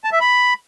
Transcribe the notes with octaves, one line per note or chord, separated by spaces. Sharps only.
A5
E5
B5